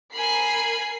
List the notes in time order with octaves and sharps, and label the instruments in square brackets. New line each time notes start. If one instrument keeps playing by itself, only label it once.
[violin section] A#4 C7 [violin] G#5 B5